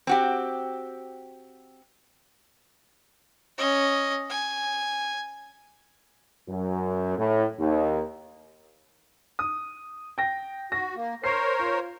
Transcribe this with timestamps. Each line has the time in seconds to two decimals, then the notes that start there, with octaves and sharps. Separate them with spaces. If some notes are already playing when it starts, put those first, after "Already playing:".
0.07 C4 F#4 G4
3.58 C#4 D#5
4.30 G#5
6.48 F#2
7.17 A2
7.59 D#2
9.39 D#6
10.18 G5 A#6
10.72 F#4 A#6
10.95 A#3
11.24 A#4 C5 C#5 C7
11.59 F4